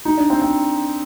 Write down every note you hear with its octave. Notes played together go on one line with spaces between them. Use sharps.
D#4
D4
C4
C4